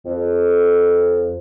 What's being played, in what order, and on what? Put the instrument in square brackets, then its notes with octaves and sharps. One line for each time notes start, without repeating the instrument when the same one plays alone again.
[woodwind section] F2